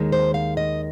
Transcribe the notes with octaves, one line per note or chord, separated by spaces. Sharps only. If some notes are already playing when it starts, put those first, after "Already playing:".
Already playing: D#2 D#3 G#3
C5
F5
D#5